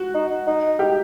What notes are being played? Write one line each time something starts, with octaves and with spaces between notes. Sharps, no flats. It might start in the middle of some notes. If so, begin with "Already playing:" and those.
Already playing: F#4
D#4
D#4
G4